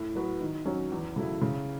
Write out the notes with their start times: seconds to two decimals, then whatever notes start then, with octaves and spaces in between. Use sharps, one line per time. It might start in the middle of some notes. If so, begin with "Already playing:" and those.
Already playing: A2
0.15 F#3 B3 F#4 B4
0.41 D#3
0.66 F#3 C#4
0.92 E2
1.16 C#3 F#3 A3 E4
1.42 C#3